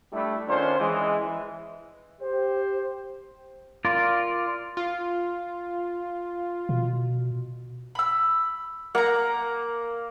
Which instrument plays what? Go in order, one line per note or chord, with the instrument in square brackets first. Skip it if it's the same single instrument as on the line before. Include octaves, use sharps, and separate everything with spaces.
[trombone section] G3 A3 D4 E4
D#3 C#4 D4 F4 C5
E3 G#3
E3
[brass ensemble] G4 C5
[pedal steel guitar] F4 A#4 D5
[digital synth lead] F4
[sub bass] B2
[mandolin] B5 E6
[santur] A#3 [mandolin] F#5 A#5